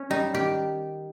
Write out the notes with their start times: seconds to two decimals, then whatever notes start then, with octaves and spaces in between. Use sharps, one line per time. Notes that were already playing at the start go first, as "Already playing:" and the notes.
Already playing: C#4
0.10 G3 D#4
0.34 D#3 G4